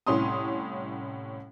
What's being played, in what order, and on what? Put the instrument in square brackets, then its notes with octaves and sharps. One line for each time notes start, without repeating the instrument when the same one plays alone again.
[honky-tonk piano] C2 A2 C#4 C6 D#6